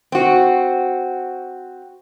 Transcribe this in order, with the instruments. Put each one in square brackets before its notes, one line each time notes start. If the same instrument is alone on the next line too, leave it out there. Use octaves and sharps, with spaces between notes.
[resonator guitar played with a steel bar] C4 F#4